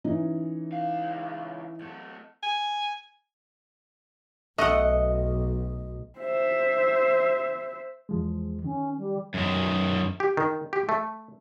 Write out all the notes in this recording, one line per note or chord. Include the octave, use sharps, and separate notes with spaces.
E3 C#4 D#4
C#2 F5
F#3 A3
G#5
B1 A3 D#5 F#5
C5 E5
E2 F3 G#3
D#3 C#4
G3
F#2 D#3
G4
D#3
G4
A3